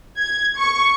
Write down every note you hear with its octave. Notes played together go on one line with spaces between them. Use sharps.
G#6
C#6